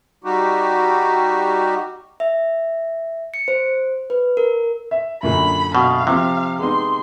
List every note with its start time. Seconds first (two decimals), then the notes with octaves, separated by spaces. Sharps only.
0.24 G3 D#4 F#4 G4
2.20 E5
3.34 C#7
3.48 C5
4.10 B4
4.37 A#4
4.91 E5
5.23 F#2 A#2 D3 B5
5.75 B2 F5
6.07 C3 F3 C4
6.59 G#3 B3 D#4 C6